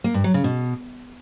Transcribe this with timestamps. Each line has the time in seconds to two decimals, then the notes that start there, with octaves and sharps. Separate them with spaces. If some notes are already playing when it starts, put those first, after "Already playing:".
0.04 A#3
0.14 G2
0.24 F#3
0.34 C#3
0.44 B2